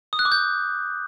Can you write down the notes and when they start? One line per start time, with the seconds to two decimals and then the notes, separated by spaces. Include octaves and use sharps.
0.13 D#6
0.19 F#6
0.25 D6
0.32 G6